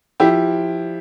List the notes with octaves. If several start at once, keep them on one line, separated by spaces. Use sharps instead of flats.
F3 E4 G4